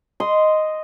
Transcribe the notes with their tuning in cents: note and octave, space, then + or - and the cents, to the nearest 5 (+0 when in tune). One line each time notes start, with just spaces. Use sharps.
D#5 +0 C6 -10